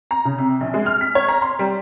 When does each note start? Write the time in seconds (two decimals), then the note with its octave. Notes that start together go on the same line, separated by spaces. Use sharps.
0.11 A#5
0.25 C#3
0.38 C3
0.61 A#1
0.74 G#3
0.86 F6
1.01 B6
1.15 C#5
1.28 A#5
1.42 C6
1.59 G3